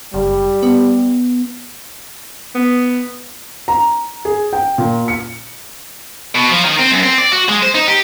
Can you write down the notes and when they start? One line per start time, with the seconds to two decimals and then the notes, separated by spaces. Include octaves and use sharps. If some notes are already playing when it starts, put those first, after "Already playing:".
0.14 F#1 G3
0.63 B3
2.55 B3
3.68 A#5
4.25 G#4
4.53 G5
4.78 A#2
5.08 C#7
6.35 B2
6.50 F3
6.64 D#3
6.79 C4
6.91 F#2
7.03 C4
7.18 D5
7.32 F#4
7.49 G#3
7.63 C5
7.75 D#4
7.88 G4